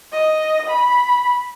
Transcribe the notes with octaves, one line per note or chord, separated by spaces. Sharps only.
D#5
B5